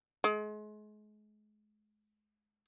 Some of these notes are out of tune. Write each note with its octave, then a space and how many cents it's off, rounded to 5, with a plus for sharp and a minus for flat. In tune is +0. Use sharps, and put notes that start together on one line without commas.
G#3 +35